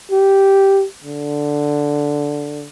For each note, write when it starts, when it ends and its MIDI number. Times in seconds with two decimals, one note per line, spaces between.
0.11 0.84 67
1.04 2.67 50